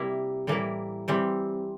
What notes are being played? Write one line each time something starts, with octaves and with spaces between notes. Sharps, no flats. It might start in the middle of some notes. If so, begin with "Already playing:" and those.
Already playing: C3 G3 A#3 E4
A2 E3 G3 A#3 E4
E3 G3 C4